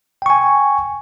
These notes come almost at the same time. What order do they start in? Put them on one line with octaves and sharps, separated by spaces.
G5 C#6 G#5